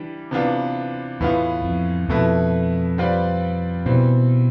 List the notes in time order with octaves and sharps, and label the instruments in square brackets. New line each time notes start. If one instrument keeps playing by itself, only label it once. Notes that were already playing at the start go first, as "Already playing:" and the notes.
Already playing: [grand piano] E3 G3 D4 G4
C3 E3 B3 D4 F4
[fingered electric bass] E2 [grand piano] A2 E3 B3 F4
[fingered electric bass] F2
[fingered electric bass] F2 [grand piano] B2 A3 E4 B4
[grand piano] G3 C4 F4 B4 D5
[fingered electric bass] B2 [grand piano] E3 G3 C4